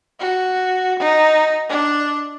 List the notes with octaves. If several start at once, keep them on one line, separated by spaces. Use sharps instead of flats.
F#4
D#4
D4